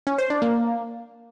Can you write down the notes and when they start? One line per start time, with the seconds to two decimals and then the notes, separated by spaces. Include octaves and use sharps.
0.07 C#4
0.18 C5
0.30 D4
0.42 A#3